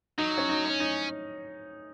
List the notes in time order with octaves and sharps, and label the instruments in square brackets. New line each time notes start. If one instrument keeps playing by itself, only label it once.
[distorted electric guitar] F#3 [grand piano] D#4
[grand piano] C#4
D#4
[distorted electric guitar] C#4
[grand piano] D#4